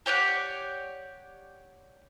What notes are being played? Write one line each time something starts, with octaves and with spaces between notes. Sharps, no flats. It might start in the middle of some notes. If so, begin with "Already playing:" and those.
G4 C#5 D5 F#5